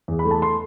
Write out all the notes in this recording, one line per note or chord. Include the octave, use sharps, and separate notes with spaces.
E2
B5
A3
A5
C6